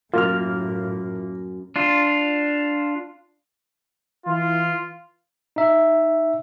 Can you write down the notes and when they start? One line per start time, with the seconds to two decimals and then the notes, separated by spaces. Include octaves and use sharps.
0.14 F#2 A2 A#3 F4 F6
1.76 D4 F4
4.26 E3 F4
5.56 D#4 E5